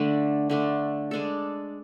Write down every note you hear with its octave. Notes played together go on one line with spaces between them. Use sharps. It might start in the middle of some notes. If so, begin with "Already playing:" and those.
Already playing: D3 A3 D4
D3 A3 D4
G#3 D4 A4